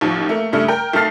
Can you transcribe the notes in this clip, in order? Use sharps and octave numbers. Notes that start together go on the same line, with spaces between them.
A1 D#2 D#3 F3
A3 A#3
G2 C#3 G3 A3
A#4 G5
B1 A3 A5 F6 A6 C7